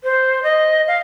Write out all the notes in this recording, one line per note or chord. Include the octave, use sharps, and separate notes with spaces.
C5
D#5
F5